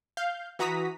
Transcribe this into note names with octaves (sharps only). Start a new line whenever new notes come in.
F5 G6
E3 F#4 A#5 D#6 B6